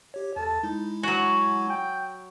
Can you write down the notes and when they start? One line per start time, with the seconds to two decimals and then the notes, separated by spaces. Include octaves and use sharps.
0.14 G4 C#5
0.36 E2 A4 A5
0.63 G#3 D#4 E4
1.03 F#3 F#4 G#5
1.70 G5